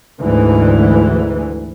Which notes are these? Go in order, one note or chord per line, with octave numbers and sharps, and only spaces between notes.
D2 G#2 E3